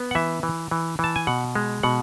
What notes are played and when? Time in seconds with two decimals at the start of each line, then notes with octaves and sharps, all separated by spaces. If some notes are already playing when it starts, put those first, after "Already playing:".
Already playing: B3
0.11 F#5
0.15 E3 E5
0.43 E3
0.71 E3
0.99 E3 A5
1.16 G#5
1.27 B2 F#5
1.55 G#3
1.83 B2 F#5